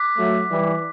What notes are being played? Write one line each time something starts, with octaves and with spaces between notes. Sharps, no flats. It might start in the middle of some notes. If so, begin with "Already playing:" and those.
Already playing: D6 F#6 B6
F#3 A3
E3 G3